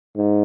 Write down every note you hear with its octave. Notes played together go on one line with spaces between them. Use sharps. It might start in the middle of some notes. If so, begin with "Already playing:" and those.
G#2